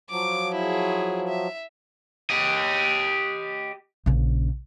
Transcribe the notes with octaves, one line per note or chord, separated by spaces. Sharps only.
F3 F#3 D6
E4 G#4
E5
G4 D#5
A#1 C#3